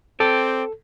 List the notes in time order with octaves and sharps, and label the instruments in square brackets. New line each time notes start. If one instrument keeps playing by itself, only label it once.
[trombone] C4 [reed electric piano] A4 [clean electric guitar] D5 G5